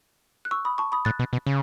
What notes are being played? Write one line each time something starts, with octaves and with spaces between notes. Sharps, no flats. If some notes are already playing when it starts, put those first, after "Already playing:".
F#6
C#6 E6
B5 D#6
A5 C#6
B5 D#6
A2 F#6 A6
B2
B2
C#3